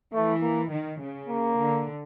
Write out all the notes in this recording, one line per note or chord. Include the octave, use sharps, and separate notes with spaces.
E3 A3
A#3
D#3
C#3
A#3
D3